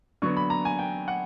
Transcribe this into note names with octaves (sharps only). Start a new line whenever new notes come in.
D3 F#3 B3 C#6
B5
A#5
G#5
G5
F#5